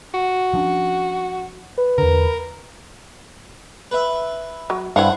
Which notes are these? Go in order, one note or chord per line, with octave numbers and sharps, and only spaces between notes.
F#4
F3 C#4 D4
B4
E2 D3 A#4
B4 E5
F#3
G2 E4 C5 F5 F#5 C#6